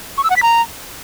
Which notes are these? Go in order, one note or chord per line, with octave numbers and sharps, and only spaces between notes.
C#6
E6
F#5
B6
A#5